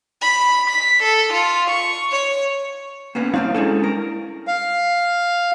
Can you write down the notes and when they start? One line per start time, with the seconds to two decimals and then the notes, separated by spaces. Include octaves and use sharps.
0.22 B5
0.70 B6
1.03 A4
1.33 F4
1.70 C#6
2.12 C#5
3.15 A#3 B3 C#4
3.34 B1 G3 C4 E4 F5
3.55 G#3 C#4 D4 E4 A4
3.84 A#4
4.47 F5